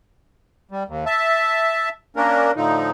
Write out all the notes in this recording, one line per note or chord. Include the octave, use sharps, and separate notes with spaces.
G3
D#2
E5 A5
A#3 C#4 D4 A#4
A2 D3 F3 D#4